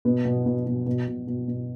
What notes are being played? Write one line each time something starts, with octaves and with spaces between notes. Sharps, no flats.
B2 B3
B2
B2
B2
B2
B2
B2
B2